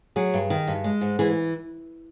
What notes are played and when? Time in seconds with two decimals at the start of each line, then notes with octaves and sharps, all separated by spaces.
0.16 F#3 G#4
0.34 G2
0.50 D#3
0.68 G2
0.84 G#3
1.01 G#2
1.19 E3 G#4